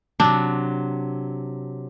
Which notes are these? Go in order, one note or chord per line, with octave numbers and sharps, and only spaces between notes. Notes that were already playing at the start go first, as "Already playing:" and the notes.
C3 F#3 D4